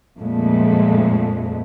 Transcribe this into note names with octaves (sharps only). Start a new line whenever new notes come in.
F2 A#2 G#3 A3